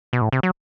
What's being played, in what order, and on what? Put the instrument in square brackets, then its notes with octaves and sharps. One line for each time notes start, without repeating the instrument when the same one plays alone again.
[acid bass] B2
A2
C3
F#3